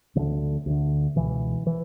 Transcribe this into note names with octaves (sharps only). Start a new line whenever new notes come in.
D2 D3 E3
D2 D3
C#2 B2 E3
E3